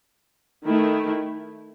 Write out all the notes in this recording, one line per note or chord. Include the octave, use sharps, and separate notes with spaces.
D#3 A3 E4